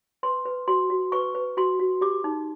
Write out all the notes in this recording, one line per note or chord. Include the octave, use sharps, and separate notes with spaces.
B4 C6
B4
F#4 C6
F#4
B4 C#6
B4
F#4 C6
F#4
G4 D6
D#4